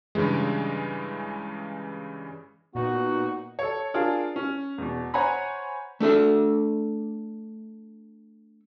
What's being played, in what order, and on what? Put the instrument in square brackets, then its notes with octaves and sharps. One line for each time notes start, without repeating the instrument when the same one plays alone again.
[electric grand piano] G2 C#3 E3 G#3
[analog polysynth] A#2 D#4 [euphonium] B3 [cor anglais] F#4
[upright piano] A4 C#5
D4 F4 G#4 A#4
C#4
E2 B2
C5 C#5 F#5 G#5 A#5 B5
[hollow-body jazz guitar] A3 D4 A4 E5